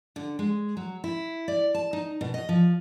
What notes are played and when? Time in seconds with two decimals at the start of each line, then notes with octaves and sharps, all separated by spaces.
0.16 D3
0.39 G#3
0.77 F#3
1.04 E4
1.48 D5
1.74 A5
1.93 D#4
2.21 B2
2.34 D#5
2.49 F3